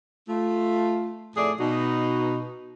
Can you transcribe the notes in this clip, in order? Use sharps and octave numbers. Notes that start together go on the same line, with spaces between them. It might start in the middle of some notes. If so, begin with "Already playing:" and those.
A3 F4
F2 A2 A3 G#4 A4 D5
B2 D#4 F#4